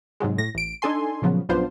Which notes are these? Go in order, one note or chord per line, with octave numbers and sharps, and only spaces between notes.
G#2 C3 F#3 G#3
A2 A#6
A1 D7
D4 D#4 A4 G#5 C6
A#2 C#3 F3 F#3 B3
A#1 F#2 B3 D4 F4 C5